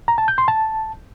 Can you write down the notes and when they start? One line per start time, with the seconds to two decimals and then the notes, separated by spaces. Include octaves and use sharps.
0.08 A#5
0.18 A5
0.28 G6
0.38 C6
0.48 A5